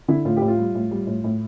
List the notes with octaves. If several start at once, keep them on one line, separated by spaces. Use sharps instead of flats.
D3 E4
A2 F4
A2 G4
F4
G3
A2
G3
A2
A2